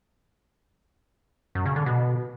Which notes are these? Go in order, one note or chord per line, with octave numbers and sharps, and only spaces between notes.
F#2
C#3
D3
B2